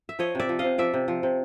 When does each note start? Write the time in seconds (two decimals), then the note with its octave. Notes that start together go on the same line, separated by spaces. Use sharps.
0.09 E5
0.19 F3 C#5 D#5
0.35 C3 D5 E5
0.49 F3
0.59 D#5 F5
0.64 C3
0.78 F3 D5 E5
0.94 C3
1.08 F3
1.23 C3